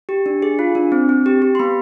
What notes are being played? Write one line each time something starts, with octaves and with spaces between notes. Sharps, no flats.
G4
D4
G#4
F4
D4
C4
C4
G4
G4
C6
B3 B5